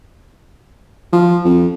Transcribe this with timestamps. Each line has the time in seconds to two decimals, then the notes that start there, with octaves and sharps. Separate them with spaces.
1.13 F3
1.45 F2